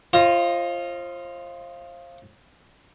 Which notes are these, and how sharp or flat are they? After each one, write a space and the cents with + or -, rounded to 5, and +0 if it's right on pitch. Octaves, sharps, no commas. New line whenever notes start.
F4 -15 C5 +35 D#5 +0